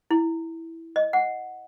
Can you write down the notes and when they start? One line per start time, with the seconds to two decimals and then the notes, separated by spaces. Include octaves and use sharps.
0.11 E4
0.96 D#5
1.13 F#5